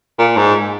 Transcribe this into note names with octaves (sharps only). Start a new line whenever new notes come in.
A#2
G#2